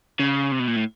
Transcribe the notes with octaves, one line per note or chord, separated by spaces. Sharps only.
C#3
C3
B2
A#2
A2